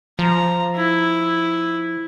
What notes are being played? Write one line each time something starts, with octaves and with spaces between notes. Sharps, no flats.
F3 A#5
E4